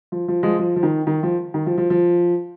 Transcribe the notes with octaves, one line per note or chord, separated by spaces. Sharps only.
F3
F3
F3 G#3
F3
F3
D#3
D#3
F3
D#3
F3
F3
F3